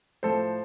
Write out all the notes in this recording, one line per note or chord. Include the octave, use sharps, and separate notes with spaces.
A2 F3 A4 C5